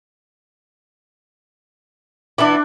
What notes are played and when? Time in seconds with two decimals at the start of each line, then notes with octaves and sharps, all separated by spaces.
2.38 E3 B3 D4 E4 D6